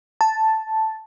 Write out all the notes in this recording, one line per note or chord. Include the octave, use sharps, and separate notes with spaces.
A5